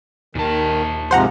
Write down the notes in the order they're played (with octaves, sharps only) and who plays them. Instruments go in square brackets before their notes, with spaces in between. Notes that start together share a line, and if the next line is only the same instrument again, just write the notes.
[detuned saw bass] D#2 [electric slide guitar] A#2 A5 [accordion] D#3
[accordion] G#2 C3 F3 [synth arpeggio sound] C5 F#5 A#5